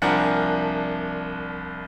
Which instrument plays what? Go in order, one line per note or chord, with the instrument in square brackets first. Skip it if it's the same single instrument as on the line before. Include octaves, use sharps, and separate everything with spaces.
[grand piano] C2 F3 D4 A#4 F#5 G#5